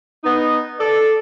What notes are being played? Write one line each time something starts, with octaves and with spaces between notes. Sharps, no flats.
B3 D#4
A4 D5